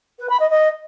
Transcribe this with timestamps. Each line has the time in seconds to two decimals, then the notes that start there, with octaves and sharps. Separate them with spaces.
0.19 B4
0.29 B5
0.39 D#5
0.50 D#5